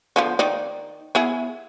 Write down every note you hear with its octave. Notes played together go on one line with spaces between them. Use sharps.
D3 F3 B3
D#3 D#4 D5
B3 E4 G#4